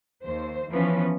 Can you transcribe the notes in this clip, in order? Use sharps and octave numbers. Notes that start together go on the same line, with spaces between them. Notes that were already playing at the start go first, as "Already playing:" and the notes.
D#2 C5
E3 F3 B3 C#4 B4